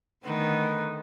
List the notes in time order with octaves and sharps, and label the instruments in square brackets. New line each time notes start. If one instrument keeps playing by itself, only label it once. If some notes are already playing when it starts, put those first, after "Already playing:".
[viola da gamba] D3 D#3 A3 [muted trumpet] B3